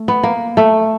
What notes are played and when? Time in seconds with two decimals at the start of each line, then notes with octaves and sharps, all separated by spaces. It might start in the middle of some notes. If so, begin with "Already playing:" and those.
Already playing: A3
0.08 B3
0.23 A#3
0.57 A3